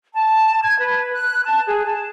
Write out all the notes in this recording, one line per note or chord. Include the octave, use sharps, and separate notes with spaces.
A5
G#6
B4
F#6
A5
G#4
A5